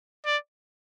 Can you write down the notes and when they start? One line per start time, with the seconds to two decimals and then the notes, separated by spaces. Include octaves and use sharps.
0.26 D5